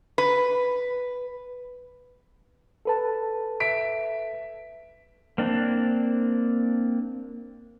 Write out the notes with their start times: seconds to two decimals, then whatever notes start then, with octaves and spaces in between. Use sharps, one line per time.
0.18 B4
2.85 A4 B4 A5
3.60 E5 B6 D7
5.38 A#3 C4 D4